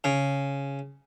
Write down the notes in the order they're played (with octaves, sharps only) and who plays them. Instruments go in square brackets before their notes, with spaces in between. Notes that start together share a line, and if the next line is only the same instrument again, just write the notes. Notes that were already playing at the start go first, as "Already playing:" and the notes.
[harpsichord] C#3